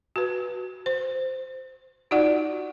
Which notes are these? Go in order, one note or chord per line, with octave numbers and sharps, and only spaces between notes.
F#4 B4
C5
D#4 F4 F#4 D5 F#5